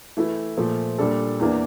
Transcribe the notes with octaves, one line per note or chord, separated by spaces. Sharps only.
E3 A3 E4
A#2 F3 A3
A#2 G3 D4 A4
E2 E3 A#3 D4